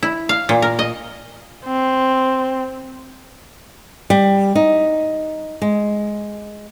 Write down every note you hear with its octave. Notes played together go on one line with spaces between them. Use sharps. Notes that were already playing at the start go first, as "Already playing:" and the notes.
E4
F5
A#2
A#4
D#5
C4
G3
D#4
G#3